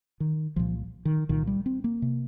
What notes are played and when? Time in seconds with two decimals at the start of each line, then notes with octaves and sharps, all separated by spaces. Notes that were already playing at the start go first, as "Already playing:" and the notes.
0.20 D#3
0.56 C2 A#2 F3
1.05 D#3
1.29 C2 A#2 D#3
1.47 G3
1.66 C4
1.84 A#3
2.02 C3